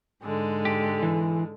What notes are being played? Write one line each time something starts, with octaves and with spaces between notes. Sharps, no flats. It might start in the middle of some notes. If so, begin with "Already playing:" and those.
G#2 D3 G#3
G4
E3